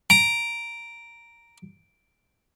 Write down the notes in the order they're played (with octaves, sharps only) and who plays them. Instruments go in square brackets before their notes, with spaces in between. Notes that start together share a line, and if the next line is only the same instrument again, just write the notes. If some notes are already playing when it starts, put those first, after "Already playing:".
[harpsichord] A#5 [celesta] D7